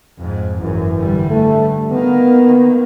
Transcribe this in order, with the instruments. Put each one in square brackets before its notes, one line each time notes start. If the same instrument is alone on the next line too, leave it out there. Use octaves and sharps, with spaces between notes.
[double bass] F2 G#2
[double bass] G#1 F#2 [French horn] E3
[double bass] D3 G3
[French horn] A3
[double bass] D#3 A#3 [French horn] B3